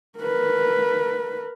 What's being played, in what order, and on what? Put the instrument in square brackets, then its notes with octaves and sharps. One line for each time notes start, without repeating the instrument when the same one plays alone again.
[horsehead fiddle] A#4 B4